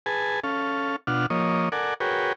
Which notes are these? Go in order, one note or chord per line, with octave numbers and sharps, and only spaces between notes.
G#4 B4 G#5 A5
C#4 A4 F5
B2 D4 F4 F#5 F6
F3 A#3 C#5 D#5
A4 A#4 D5 F#5 G#5
F#4 G#4 A#4 B4 C#5 G5